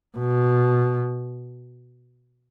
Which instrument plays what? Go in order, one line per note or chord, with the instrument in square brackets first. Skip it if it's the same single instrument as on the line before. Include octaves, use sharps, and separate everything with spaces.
[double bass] B2